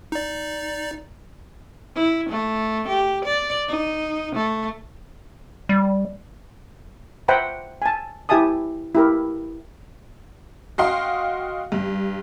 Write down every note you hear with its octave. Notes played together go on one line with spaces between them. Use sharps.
D#4 D5
E4
A3
G4
D5
D#4
A3
G3
C5 E5 F#5 G5 A#5 B5
G#5 A5
E4 G4 E5 G#5 A5 D#6
E4 G4 A#4
F#4 D#5 F5 G5 C6
G2